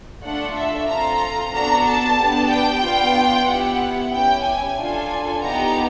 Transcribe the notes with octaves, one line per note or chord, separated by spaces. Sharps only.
A3 D4 F4 A4 F#5
E5
C4 F4 A4 A#5
B3 D4 F#4 A4 A#5
A5
B3 D4 G4
G5
B3 D4 F4
B3 E4 G4 F#5
C#4 E4 G4 G5
G#5
D4 F4 A4
B3 D#4 G4 A#5